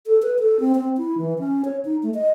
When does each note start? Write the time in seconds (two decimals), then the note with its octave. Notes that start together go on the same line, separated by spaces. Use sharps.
0.06 A4
0.22 B4
0.39 A4
0.60 C4
0.75 C4
0.98 E4
1.18 E3
1.39 C#4
1.65 C#5
1.85 D#4
2.03 A3
2.14 D#5